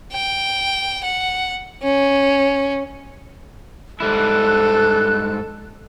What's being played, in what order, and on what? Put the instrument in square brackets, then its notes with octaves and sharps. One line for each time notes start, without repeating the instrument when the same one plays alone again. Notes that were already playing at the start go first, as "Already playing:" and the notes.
[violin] G5
F#5
C#4
[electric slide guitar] G#2 G3 E4 [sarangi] A4 [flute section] F#6